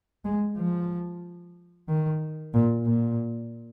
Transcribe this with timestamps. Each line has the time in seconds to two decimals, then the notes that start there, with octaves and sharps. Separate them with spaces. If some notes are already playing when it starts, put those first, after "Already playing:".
0.25 G#3
0.58 F3
1.88 D#3
2.53 A#2
2.85 A#2